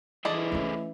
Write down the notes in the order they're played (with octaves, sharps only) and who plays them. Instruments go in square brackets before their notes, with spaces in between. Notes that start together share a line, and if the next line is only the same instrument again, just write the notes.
[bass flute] E3 [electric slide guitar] E4 G#4 A4 [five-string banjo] D5 D#5 A5
[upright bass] A3 C#4